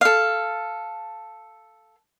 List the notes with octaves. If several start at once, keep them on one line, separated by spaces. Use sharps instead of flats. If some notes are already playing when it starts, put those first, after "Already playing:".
A4 F5